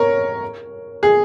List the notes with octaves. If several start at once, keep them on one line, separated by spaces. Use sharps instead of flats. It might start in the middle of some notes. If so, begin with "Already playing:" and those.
Already playing: A#4 C#5
G#4